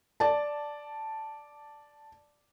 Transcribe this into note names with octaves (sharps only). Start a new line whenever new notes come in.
D5 A5